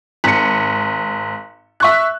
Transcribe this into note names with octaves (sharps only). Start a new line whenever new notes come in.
G#1 C#7
E5 C#6 F#6